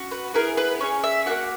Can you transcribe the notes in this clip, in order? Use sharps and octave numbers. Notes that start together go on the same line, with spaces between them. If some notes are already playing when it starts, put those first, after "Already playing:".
Already playing: C#4 F#4
B4
B3 E4 G#4 A#4
B4
C#4 E4 G#4 C#5
E5
A#3 D#4 F#4 F#5